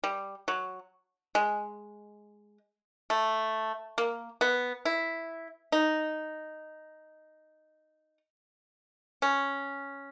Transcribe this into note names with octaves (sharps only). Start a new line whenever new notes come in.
G3
F#3
G#3
A3
A#3
B3
E4
D#4
C#4